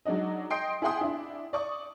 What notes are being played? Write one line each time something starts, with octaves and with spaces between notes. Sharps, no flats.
F#3 G#3 D4 D#4 D#5
D#5 G5 C6 D#6 C7 D7
E4 G#4 F#5 G5 C6 D#6
D4 E4
D5 C#6 D#6